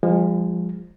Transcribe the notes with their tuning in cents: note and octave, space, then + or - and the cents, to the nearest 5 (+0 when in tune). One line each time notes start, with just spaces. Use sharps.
F3 +0 G#3 -35